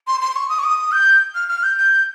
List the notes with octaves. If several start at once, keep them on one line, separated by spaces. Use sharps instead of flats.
C6
C6
C#6
D#6
C#6
D#6
G6
F6
F6
G6
G6